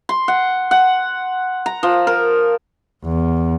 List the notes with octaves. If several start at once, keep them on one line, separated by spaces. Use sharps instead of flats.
C6
F#5
F#5
A#5
F3
A#4
E2